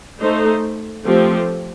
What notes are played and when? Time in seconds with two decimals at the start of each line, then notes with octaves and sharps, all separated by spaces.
0.20 A3 D#4 A4 C5
1.05 F3 A3 C4 G4